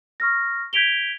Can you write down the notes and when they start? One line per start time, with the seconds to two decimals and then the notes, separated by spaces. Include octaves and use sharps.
0.20 C#6 F6 A#6
0.73 G6 G#6 B6 D7 F7 G7